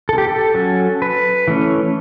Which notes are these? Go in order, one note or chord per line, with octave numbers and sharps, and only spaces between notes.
A4
G4
A4
F#3 C#4
B4
E3 A3 C#4